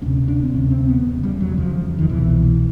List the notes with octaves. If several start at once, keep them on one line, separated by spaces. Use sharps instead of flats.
D2 C3 C#4
D4
C4
D2 C3 C#4
C4
B3
E2 C#3
G3
F#3
E2 C#3 F3
D#3
C2 B2 E3